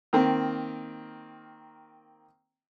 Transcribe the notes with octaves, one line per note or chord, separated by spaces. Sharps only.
D#3 A#3 C4